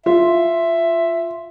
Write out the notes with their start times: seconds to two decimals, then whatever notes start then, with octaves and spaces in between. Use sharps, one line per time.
0.06 F4 E5